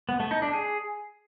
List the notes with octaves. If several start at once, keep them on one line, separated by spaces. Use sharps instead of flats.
B3
A3
D#4
D4
G#4